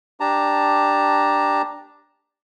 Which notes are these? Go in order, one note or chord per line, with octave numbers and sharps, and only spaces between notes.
D4 G4 A5 A#5